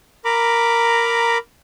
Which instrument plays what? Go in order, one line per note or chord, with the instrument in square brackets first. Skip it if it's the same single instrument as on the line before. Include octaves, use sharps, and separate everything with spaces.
[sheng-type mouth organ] A#4 A#5 B5 D6